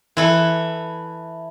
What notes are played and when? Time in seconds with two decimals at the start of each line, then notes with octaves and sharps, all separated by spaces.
0.17 E3 E4 A4